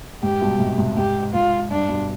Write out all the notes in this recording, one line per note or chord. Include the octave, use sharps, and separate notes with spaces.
G#2 G4
G2 B2
G#2 C3
G#2 C3
G#2 G4
G#2 F4
G2 D4
G2 B2